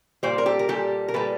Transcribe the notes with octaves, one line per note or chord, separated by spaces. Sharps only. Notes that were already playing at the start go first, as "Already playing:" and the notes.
A#2 G3 C5 D5
A#4
G4 A4
A#4
A#2 G3 G4 A4
A#4
A#2 G3 A4 B4